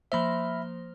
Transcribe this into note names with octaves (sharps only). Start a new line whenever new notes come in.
F3 A#3 C5 E5 B5